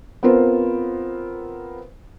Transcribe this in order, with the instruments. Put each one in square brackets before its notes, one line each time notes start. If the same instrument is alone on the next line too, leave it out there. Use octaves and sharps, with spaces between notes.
[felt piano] B3 C4 F4 A#4 C5